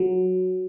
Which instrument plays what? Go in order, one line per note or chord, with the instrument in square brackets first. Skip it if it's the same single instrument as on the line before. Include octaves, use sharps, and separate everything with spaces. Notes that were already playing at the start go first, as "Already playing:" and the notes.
Already playing: [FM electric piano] F#3